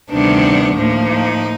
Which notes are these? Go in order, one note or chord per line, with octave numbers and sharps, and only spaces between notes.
D2 C3 D#3 G3 B3 D4
A2 F3 A#3
D#4